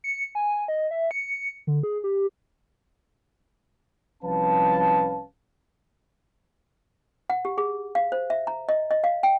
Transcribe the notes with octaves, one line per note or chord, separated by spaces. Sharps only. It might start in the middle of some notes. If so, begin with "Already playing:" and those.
C#7
G#5
D#5
E5
C#7
D3
G#4
G4
C2 F3 C#4 B4 F5 A5
F#5
G4
G#4
F5
C5
E5
A#5
D#5
D#5
F5
G5